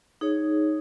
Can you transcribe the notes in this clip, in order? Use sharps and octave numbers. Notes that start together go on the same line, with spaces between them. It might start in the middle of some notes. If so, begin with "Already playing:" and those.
D#4 G#4 C#5